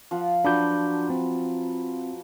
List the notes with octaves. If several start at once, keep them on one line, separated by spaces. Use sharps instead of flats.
F3 F5 F#5
F3 F#3 D4 B4 D6 G6
C4